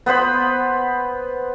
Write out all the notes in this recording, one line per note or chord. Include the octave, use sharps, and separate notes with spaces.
B3 B4 C5 B5